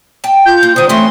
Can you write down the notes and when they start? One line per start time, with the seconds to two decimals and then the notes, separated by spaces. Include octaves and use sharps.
0.24 G5 A5
0.46 F4 G6
0.63 A#3
0.76 D3 D#3 C5 D#6
0.89 E3 A3 C4 C#4 C6